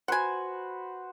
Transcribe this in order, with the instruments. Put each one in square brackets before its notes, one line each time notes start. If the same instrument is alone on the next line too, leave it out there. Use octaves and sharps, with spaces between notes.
[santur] F#4 B4 C5 [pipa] F#5 G#5